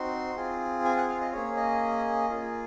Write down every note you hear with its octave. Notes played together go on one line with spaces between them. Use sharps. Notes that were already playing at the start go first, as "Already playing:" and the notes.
Already playing: C4 D#4 F#4 C6
C4 F4 G#4
G#5
F#5
F5
D#5
A#3 C#4 G#4 C#5
D#5
A#3 F4 G#4